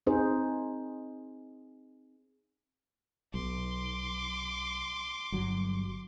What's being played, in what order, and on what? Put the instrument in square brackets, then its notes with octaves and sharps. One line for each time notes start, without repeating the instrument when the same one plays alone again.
[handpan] C4 D#4 G#4 C5
[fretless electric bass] B1 [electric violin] C6 D6
[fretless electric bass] G1 F#3